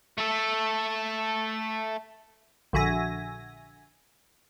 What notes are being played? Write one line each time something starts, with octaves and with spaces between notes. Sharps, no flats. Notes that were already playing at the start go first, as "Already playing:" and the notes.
A3 A4
A#1 D3 F#4 E5 G#5 A#6